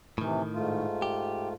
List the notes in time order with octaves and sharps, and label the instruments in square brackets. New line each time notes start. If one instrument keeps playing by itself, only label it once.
[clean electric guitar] A2 D#3 [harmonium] C3 E3
[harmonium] G#2 A3 F4
[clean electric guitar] G4